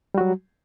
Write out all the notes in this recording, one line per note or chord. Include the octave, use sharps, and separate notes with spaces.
F#3 G3 F#4